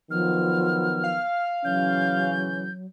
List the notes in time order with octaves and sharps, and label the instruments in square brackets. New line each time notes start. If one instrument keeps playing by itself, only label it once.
[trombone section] D#3 F#3 B3 [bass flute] F3 [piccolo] F6
[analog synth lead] F5
[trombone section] C#3 E3 C#4 [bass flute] F#3 [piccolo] G6